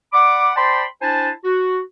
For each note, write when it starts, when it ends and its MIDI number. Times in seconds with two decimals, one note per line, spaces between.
0.13 0.50 74
0.13 0.50 78
0.13 0.50 83
0.13 0.50 86
0.56 0.84 72
0.56 0.84 74
0.56 0.84 79
0.56 0.84 81
0.56 0.84 83
0.56 0.84 84
1.01 1.29 62
1.01 1.29 64
1.01 1.29 72
1.01 1.29 80
1.01 1.29 81
1.44 1.79 66